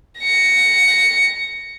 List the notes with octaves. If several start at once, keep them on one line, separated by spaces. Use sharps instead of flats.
A#6 C#7